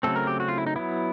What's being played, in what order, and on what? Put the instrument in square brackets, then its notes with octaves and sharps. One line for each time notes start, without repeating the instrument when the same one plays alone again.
[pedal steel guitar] C#3 F#3 A3 C4 A4
A#4
G4
F#4
F4
E4
D#4
F#3 B3 E4